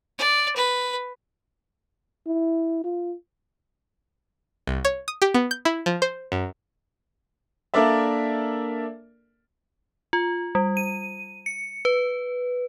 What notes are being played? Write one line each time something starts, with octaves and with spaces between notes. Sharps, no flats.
D5
B4
E4
F4
C2
C#5
D#6
G4
B3
G6
E4
F3
C5
F#2
A#3 D4 A4 A#4 D5 E5
F4
G3
D#7
C#7
B4